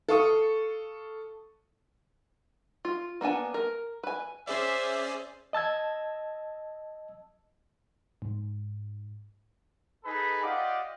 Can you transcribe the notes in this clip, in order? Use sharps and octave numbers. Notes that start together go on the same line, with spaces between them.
A4 F5 C#6 D#6
F4
A#3 B3 D4 G#5
A#4
B4 G#5
C#4 G#4 C5 D5 E5
D#5 A5 E6 G#6
G#2
D#4 G#4 A4 B4 B5
F4 G4 D5 D#5 F#5